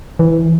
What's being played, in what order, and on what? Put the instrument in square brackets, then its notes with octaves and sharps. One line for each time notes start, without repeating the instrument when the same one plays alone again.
[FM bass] E3